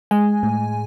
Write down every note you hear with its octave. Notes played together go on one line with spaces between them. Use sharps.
G#3 G#5
A2